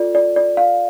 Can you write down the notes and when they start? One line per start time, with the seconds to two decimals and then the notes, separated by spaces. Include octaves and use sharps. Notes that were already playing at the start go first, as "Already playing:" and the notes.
Already playing: F4 A4 D5
0.15 D5
0.36 D5
0.57 F5